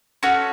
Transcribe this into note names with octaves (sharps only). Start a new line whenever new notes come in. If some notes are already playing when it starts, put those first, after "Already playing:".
C#4 F#4 A4